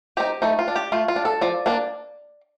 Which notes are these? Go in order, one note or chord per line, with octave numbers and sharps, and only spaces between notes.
C4 D#4 G4
A3 D#4
F4
D4
G4
A3 F4
F4
D4
A4
F3 D5
A#3 D4